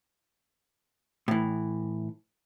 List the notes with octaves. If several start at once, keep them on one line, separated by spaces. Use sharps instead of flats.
A2 E3